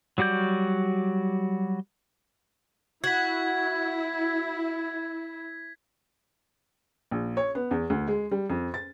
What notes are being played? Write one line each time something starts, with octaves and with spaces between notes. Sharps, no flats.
F#3 G3 F#4 D5 G6
E4 F#4 G#6 B6
A#1
C#5
B3
E2
D2
G#3
G3
F2
A6